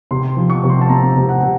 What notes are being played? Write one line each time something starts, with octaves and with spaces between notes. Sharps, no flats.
C3 C6
F3
C#6
C3
C6
A5
C4 A#5
C3
F#5
C3